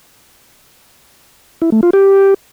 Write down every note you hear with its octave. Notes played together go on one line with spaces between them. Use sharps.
E4
A3
F4
G4